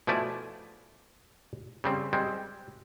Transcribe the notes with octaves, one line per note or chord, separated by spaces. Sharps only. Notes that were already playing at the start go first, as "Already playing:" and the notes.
B2 F3 A3 E4 D5 G#5
C#3 G3 C4
G3 G#3 C4